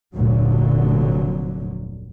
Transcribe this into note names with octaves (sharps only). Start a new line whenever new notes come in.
F1 D2 A#2 D3 F#3